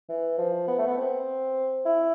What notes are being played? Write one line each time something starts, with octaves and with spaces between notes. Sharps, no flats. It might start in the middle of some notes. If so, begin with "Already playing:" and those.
E3
F3
B3
A3
B3
C4
E4